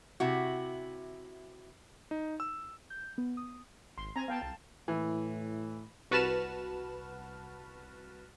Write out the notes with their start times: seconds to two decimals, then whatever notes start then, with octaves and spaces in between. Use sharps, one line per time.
0.20 C3 E4 F#4
2.11 D#4
2.40 E6
2.90 G6
3.18 B3
3.37 D#6
3.98 G#1 C6
4.16 C4 G#5 A#5
4.28 B3 F5 G5 A5
4.42 C2 A5
4.88 A2 E3
6.11 C2 F#4 B4 A5 F6 E7